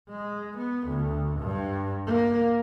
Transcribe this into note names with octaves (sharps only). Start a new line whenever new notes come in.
G#3
B3
D2
G2
A#3